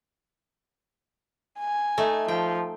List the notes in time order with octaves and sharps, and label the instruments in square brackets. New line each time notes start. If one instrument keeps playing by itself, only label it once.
[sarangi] G#5
[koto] A3 D#4
[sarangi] F3 [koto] G5